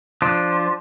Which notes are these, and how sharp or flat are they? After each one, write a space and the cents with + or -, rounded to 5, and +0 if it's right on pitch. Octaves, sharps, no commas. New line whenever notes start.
F3 +0 D4 +5